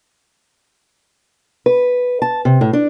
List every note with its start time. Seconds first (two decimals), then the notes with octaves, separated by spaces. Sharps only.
1.66 B4
2.22 A5
2.45 C3
2.61 A2
2.73 D4